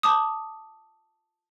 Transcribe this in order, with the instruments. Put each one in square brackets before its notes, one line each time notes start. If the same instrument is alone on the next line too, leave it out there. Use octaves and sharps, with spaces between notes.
[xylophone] A5 D6 D#6